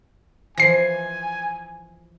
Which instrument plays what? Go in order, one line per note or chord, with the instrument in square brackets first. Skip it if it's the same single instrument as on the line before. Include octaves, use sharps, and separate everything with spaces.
[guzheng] E3 F3 [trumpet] G#5 [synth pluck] A#6 C7